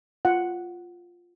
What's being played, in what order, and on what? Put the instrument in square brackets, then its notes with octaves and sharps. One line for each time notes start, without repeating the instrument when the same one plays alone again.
[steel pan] F4 F#5